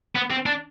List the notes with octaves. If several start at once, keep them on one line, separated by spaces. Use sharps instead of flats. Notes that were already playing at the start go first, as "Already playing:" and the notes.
B3
C4
D4